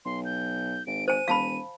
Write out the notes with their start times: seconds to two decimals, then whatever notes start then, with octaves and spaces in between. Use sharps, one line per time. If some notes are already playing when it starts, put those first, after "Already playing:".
0.05 B1 C6
0.25 G6
0.87 G#1 D7
1.08 C5 G#5 D#7
1.28 E1 F5 A5 B5